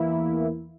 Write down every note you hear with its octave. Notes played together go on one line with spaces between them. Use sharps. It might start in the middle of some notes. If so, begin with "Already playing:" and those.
Already playing: E2 E3 A#3 E4